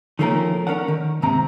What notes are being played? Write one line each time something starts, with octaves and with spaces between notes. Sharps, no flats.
D#3 F3 A3 A#3 C#4 A#4
C#4 A#4 D5 F#5
D#3
D#2 G#2 C3 C4 A#5